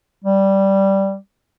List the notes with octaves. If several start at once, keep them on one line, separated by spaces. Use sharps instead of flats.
G3